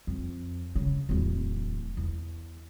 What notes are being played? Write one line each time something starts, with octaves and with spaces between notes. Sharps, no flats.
F2
C#3
D1 E2
E2